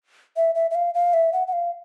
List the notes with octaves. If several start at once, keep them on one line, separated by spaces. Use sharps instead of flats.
E5
E5
E5
F5
F5
E5
F#5
F#5
F5